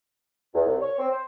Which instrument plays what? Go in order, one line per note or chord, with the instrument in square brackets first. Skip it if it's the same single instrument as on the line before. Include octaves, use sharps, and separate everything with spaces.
[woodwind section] E2
C2
C#5
C4
C5